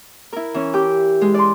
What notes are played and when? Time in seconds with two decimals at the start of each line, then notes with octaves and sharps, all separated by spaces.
0.33 E4 A#4
0.54 E3 C#4
0.74 G4 D6 G6
1.21 G#3
1.34 D5 C6